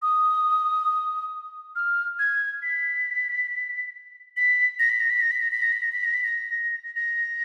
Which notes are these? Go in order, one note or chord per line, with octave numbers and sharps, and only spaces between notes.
D#6
F6
G#6
B6
B6
A#6
B6
A#6
B6
A#6
B6
A#6
B6
A#6
B6
A#6
B6
A#6
B6
A#6
A#6